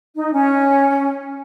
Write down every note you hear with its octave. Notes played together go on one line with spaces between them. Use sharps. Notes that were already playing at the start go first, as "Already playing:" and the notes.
D#4
C#4